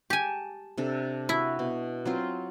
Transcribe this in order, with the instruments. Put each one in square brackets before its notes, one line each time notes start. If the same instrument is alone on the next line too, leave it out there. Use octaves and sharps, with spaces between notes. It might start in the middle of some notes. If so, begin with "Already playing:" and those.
[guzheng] G4 G#5 [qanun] A5
[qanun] C3 D4 A4
[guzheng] E4 [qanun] F#4
[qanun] B2
F#3 C4 F4